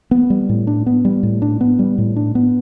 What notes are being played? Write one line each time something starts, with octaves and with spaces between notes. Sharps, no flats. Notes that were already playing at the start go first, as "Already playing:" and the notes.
B3
G3
A2
D4
B3
G3
A2
D4
B3
G3
A2
D4
B3